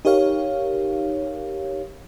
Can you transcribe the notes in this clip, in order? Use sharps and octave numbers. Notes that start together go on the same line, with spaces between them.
D#4 G4 A#4 C#5 F5